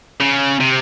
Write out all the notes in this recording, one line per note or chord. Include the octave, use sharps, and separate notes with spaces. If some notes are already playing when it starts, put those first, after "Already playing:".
C#3
C3